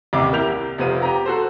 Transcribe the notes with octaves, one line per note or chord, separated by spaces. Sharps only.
A1 D#2 C3 E5 D6
A#3 E4 G4 A#4 G6 F7
C2
F1 C3 B3 C4 F4 D#7
G4 A#5
F#4 A4 C5